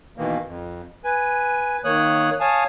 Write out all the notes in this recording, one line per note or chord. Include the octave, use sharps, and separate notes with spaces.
B2 D#3 E3 A#3
F2
B4 G#5
D#3 A#3 C#5 D#6 F#6
C#5 F5 G#5 A5 D#6